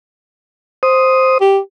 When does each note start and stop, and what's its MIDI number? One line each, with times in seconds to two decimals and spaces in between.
0.83 1.38 72
0.83 1.38 87
1.41 1.59 67